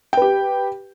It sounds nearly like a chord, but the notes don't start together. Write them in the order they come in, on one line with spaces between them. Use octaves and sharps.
G5 B4 G4